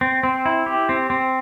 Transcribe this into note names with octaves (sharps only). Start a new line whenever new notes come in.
C4
C4
E4
G4
C4
C4